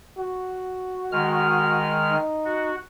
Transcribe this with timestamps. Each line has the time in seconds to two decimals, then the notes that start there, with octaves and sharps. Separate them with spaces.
0.18 F#4
1.12 D#3 G#3 F6
2.11 D#4
2.45 F#4